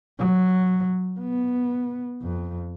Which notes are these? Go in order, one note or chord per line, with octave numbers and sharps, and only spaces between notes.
F#3
B3
F2